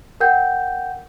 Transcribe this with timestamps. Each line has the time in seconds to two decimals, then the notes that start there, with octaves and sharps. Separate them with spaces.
0.20 A#4 F#5 G5 G6